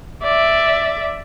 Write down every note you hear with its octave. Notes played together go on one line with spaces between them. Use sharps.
D5 E5